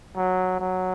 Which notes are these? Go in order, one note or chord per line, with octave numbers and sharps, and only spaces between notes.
F#3
F#3